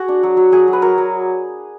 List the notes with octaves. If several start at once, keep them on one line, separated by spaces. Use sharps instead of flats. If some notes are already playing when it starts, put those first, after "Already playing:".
Already playing: F#4 G#4
D4
F#3
F#3
F#3 G#4
F#3
B4
F#3 A#4
F#3